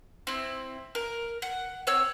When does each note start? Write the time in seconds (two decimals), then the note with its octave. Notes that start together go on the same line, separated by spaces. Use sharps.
0.27 C4 E4
0.95 A#4
1.42 F#5
1.87 C4 C#5 E6